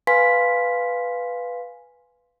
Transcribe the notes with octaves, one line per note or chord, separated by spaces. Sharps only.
B4 F5 G#5 C6 B6